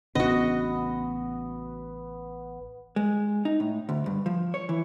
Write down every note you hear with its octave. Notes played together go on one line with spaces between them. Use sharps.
A1 C#3 B3 D4 F#4 D#5
G#3
D#4
A2
D2
G2
F3
C#5
E3